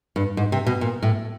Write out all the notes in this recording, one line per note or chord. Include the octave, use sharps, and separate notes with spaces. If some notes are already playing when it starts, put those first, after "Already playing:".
G2
G#2
C3
B2
A#2
A2